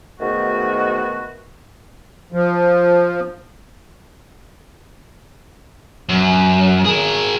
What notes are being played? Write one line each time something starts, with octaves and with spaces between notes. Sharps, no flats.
G#2 B2 D#3 A3 F#4
F3
F#2
G#4 A#4